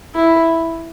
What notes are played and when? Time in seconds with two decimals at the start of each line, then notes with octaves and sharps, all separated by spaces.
0.15 E4